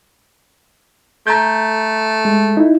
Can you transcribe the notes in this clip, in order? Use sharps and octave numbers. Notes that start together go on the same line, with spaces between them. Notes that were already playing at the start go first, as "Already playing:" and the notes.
A3 A#5 G6
G#3
D#4 E4